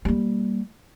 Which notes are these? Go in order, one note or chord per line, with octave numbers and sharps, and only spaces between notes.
G3 A#3